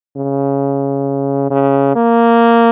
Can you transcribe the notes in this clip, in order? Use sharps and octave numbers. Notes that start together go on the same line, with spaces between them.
C#3
C#3
A#3